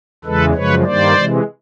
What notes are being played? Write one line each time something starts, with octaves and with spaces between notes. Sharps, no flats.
E2 C#3 E3 G#3 A4 B4
F#2 C#3 F3 G#3 B4 C#5
G2 D#3 G3 A#3 C5 D5
C3 E3 G#3